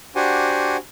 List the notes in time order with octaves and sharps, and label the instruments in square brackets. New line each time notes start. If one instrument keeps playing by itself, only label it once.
[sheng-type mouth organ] D4 F#4 G4 C5 F#5 G#5